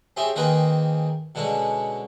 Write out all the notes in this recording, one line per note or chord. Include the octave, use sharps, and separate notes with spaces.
C4 C#4 G4 G#4 E5
D#3 A#3 C4 G#4 A#4 B4
B2 D3 G#3 C#4